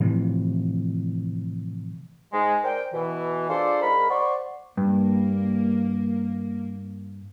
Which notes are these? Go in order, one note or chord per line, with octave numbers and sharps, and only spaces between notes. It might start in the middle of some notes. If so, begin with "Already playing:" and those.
A2 C3 E3 F3
G#2 G#3
A#4 C5 D5 G5
B2 E3
D4 F4 G#4 A4 C5 D5
G#2 A#4 B5
C5 D5 F#5 C6 C#6
G2 A#3